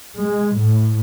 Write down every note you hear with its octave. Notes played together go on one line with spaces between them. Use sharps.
G#3
A2